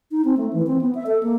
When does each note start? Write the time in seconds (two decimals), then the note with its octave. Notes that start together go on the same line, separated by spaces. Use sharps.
0.11 D#4
0.25 C4
0.37 A3
0.53 E3
0.67 C4
0.81 B3
0.95 E5
1.06 A4
1.23 A#3